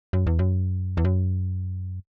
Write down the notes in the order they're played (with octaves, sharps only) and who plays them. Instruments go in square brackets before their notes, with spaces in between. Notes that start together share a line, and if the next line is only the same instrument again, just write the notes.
[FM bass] F#2
E2
F#2
E2
F#2